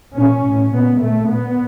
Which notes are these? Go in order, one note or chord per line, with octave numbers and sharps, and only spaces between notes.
A#2 C#4
A2
A#2 B3
A#2 A3
A#2 B3